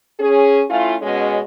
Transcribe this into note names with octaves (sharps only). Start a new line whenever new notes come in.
C#4 G#4
A3 C#4 E4 F4
B2 G#3 C#4